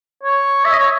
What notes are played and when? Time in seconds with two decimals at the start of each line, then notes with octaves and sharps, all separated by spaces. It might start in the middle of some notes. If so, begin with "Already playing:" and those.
0.23 C#5
0.65 E5
0.72 D#5
0.79 C#5